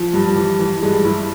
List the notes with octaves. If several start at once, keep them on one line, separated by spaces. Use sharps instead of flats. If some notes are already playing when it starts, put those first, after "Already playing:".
Already playing: F3
G2
E3
E3
G2 G#3
G2 E4